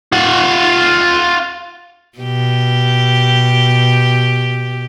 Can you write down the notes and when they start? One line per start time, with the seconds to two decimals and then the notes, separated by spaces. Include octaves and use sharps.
0.13 F4 F#5
2.19 B2 G4